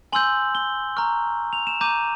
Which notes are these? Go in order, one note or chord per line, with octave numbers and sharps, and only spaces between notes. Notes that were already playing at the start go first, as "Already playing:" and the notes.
G#5 C6 E6 G6 F#7
G7
A#5 C#6 F6
F7
E7
A#5 D6 G6 D#7